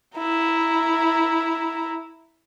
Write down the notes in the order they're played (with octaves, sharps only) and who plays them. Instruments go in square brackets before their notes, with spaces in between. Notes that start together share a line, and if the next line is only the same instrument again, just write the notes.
[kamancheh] E4 A#5